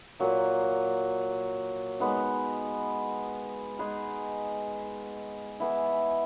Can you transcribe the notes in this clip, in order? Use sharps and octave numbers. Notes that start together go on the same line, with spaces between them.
A#2 F#3 A#3
G#3 B3 D#4
G#3 D#4 G#4 B4
E3 B3 E4